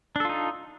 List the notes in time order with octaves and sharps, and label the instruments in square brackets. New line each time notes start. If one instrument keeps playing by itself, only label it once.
[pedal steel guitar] D4
A4
F4
D#4